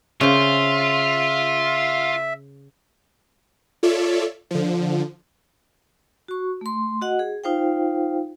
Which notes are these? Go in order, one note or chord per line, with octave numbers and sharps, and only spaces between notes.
C#3 F4 C5 E5
F4 A4 C#5 D5 E5
D3 F3
F#4 C#6
A3 C6
F#4 D#5 F#5
G#4
D#4 F4 C5 F5 G5